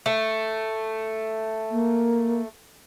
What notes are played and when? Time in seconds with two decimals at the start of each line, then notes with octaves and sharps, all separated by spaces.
0.06 A3
1.71 A#3